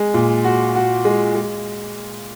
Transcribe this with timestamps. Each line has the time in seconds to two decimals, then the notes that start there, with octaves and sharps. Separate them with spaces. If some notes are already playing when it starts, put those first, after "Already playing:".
Already playing: G#3
0.14 A#2
0.44 F#4
0.75 F#4
1.05 G#3
1.35 G#3